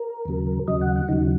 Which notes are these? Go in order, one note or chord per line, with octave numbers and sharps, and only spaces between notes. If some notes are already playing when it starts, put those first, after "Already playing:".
Already playing: A#4
D#2 C#3 F#3
D#2 C#3 F#3 D#5
F#5
F#5
D#2 C#3 F#3 D#4